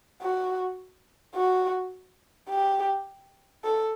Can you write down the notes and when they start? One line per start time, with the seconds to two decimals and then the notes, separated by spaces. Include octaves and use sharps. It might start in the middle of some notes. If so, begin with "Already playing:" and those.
0.22 F#4
1.35 F#4
2.50 G4
3.64 A4